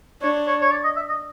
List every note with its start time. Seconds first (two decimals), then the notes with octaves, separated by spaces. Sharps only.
0.22 D4 C#5
0.47 C#5
0.61 C#5
0.71 D5
0.84 D#5
0.96 E5
1.09 D#5